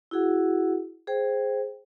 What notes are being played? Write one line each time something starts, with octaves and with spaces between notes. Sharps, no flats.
E4 F#4 G#4 F#5
G#4 C5 G5